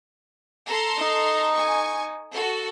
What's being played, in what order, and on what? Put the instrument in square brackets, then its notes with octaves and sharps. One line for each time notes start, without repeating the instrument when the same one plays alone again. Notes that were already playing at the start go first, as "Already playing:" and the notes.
[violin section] A4 A#5 C6
[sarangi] D#4
[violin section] G#5 C#6
F#4 A4